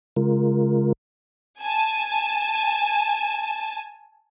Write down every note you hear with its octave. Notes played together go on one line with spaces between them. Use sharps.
C#3 G#3 F4 A#4
G#5 A5